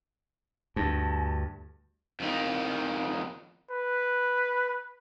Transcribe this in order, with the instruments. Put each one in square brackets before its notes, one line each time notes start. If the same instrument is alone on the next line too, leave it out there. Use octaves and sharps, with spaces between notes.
[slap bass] D2 G2 [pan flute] A5
[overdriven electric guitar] F2 D#3
[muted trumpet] B4